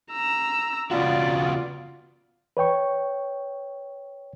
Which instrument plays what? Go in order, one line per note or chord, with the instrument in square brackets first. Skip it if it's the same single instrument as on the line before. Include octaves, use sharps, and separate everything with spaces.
[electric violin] A#5 E6
[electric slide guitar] C#3 B3 F#4 [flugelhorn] F4 [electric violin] D5
[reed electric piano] B4 C#5 G5 C#6